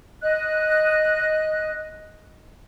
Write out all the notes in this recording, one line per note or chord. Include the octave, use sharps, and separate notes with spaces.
D#5 F#6